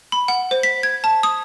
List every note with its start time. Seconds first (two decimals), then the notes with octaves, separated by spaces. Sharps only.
0.12 B5
0.28 F#5
0.51 C5
0.63 B6
0.83 G#6
1.04 A5
1.23 D#6